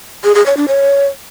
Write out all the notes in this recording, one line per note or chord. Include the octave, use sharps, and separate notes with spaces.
G#4
G#4
C#5
D4
C#5